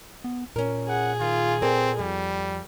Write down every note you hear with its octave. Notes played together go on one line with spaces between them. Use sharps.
B3
A#2 C#4 A#4
G#4 F#5
D#3 F4
C4 A4 A#4 D5
F2 G3